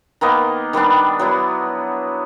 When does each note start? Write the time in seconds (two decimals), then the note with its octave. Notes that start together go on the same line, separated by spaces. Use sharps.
0.21 D#3 A#3 B3 D#5
0.73 D#3 G3 B3 D4
1.19 F#3 B3 E4